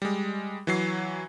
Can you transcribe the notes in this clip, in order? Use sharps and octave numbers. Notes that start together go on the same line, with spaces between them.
G3 G#3
E3 F#3 C7